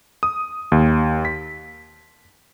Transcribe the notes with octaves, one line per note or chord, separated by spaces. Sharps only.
D#6
D#2
B6